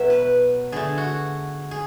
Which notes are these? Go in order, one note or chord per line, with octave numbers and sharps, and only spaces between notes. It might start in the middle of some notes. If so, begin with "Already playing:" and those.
Already playing: B2 F#3 B3 E5
B4
D3 A3 G#4
F#4
G#4